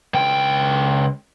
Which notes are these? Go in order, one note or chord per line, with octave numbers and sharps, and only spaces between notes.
C#2 G5